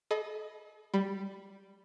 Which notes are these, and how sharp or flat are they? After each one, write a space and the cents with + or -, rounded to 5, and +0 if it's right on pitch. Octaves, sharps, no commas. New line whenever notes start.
A4 -45 D#5 +0 B5 +0
G3 +0 B5 +5